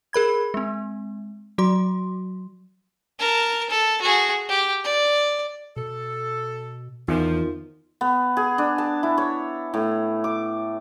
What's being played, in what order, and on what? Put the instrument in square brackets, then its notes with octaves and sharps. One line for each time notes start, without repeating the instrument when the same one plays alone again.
[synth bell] G#4 A#4 B5 G#6
G#3 C4
F#3 F#4 C6
[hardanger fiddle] A#4 A5
A4
F#4 G#4
G4
D5
[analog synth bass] B2 [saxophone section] A4
[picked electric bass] E2 [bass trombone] D#3 [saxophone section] F3 [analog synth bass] F4
[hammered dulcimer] B3
G#4
D4
A5
E4
C#5
A2
D6